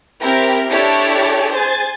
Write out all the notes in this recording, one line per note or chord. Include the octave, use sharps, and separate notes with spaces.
C4 E4 G4 A#4
D4 E4 G4 A4 C#5 D5
G#4 C5 G#5 A6